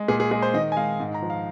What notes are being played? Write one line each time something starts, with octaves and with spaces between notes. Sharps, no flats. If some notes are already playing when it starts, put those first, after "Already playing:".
Already playing: G#3
A#2 G#4
G#4
G#3 G#4
C5
D#3 D#5
G#5
G#3 F5
G#2
A#5
F3
F5